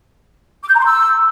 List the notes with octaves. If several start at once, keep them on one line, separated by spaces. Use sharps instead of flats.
D6
G6
A#5
C6
E6